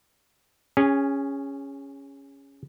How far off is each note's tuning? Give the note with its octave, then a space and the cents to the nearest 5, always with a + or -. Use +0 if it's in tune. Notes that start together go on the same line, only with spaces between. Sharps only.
C#4 +0 G#4 -25